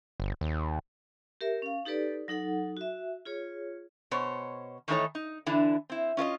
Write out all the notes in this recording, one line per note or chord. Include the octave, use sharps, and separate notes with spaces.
G1
D#2
G4 A#4 E5
C#4 F5
D#4 G4 A4 B4 D5
F#3 D#4 A4 F#5
F#4 E5
F4 G#4 C#5
B2 C5 C#5
D#3 E3 A3 D#4 A4 C#5
D#4
D3 E3 D4 E4
C4 E4
C#4 F4 C5 D#5